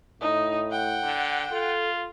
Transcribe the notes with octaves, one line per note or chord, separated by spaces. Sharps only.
A2 D#4
F#5 G5
D3
F4 A4